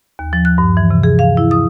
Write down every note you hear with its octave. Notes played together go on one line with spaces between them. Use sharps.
D#2
F3
F#6
G2
E3
C3
G#4
F5
E4
D#6